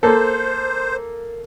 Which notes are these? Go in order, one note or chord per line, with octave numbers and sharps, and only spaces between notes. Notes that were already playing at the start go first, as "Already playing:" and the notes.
A#3 A4 C5